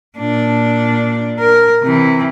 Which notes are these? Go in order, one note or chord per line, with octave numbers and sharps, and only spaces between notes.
A#2 D4
A#4
C3 E3